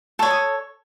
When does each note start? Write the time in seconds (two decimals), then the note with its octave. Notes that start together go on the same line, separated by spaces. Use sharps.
0.19 A4 C#6
0.22 C#5
0.30 D#6